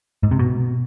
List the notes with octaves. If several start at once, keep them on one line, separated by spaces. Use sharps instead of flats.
G#2
C3
B2